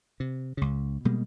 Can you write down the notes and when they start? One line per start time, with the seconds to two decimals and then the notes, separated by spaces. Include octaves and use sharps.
0.20 C3
0.57 C#2 C#3
1.05 B2 G3 G#3 A#3